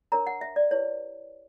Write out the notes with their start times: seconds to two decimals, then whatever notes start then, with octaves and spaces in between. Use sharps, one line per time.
0.12 D4 A#4 C#5 A#5
0.27 F#5
0.41 E5
0.56 D5
0.71 E4 G4 B4 C#5